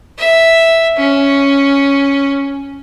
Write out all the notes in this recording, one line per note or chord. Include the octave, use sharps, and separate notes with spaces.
E5
C#4